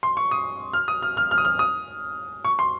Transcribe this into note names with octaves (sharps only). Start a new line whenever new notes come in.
C6
C#6
D#6
F6
D#6
F6
F6
F6
D#6
F6
D#6
C#6
C6